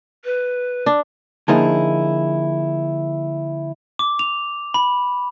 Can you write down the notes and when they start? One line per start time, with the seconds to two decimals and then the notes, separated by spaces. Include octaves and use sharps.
0.24 B4
0.86 D4
1.48 D3 F3 A#3 D#4 E4 G#4
3.99 D6
4.19 F7
4.74 B5